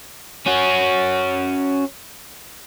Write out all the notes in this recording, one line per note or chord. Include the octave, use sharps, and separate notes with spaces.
C#4 F#4